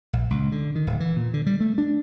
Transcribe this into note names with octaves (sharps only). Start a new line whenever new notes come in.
A#1
C#2
D3
D#3
D1
E3
A#2
D3
G3
A3
D4